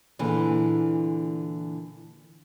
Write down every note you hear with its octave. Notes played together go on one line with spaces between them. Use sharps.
A#2 D3 E3 G#4